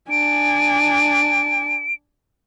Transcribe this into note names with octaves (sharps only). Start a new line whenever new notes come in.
D4 G#5 D7